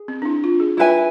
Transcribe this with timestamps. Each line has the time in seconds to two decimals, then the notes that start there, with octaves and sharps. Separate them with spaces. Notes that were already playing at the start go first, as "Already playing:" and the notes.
Already playing: G#4
0.08 C4
0.22 D4
0.25 E4
0.44 F4
0.60 G#4
0.77 E4 F4 B4 E5 G#5